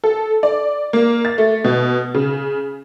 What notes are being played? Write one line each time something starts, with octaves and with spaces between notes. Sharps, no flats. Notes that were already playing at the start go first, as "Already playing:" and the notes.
A4
D5
A#3
A6
A3
B2
C#3